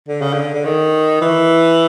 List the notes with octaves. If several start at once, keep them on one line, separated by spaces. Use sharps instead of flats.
D3
C#3
D3
D3
D#3
E3